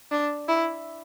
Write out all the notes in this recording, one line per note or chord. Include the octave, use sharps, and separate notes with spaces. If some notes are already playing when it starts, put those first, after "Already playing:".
D4
E4